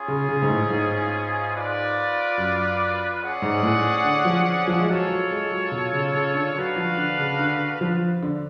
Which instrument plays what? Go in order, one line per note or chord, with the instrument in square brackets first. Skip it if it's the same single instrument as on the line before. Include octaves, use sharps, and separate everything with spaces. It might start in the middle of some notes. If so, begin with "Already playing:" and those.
Already playing: [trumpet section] C#4 F4 G#4
[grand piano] C#3
C#3
G#2
A2
G#2
[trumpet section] F4 B4 D5
[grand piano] F#2
[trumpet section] C#4 G#4 D5 F#5
[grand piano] G#2
A2
D3
F3
F3
G#3
[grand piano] F#3 [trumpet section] F4 A4 C#5
[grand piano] F#3
G#3
F#3
B2
C#3
C#3
D3
[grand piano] F#3 [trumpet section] D4 F#4 B4 F5
[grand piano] F3
D3
C#3
D3
F3
D3